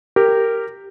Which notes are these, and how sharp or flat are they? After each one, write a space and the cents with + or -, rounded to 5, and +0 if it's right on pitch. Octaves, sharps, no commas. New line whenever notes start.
G4 +0 A#4 -15